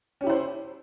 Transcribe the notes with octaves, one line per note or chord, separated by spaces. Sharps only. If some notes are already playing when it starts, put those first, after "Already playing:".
C#4 E4 G4 C5